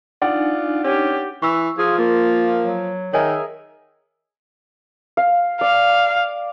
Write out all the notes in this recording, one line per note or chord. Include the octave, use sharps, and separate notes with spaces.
D4 D#4 F4 D5 F#5 G#5
C#4 G4
E3 C#6 E6
F3 F4 G#4
A#3 F4
F#3
D#3 G#4 A#4 C#5 D#5 E5 G#5
F5
D5 F5